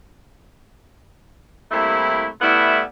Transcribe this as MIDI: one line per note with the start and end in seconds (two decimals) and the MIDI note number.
1.71 2.27 48
1.71 2.27 55
1.71 2.27 57
1.71 2.27 58
1.71 2.27 64
2.41 2.81 55
2.41 2.81 57
2.41 2.81 59
2.41 2.81 64